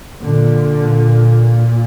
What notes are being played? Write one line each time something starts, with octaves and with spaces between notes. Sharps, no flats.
A#2 D3